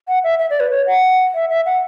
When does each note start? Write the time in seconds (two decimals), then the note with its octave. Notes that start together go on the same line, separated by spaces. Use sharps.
0.08 F#5
0.24 E5
0.39 E5
0.50 D5
0.60 B4
0.71 C#5
0.87 F#5
1.34 E5
1.50 E5
1.66 F#5